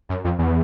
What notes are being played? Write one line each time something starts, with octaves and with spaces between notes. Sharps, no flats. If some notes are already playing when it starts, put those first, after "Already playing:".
F#2
F2
E2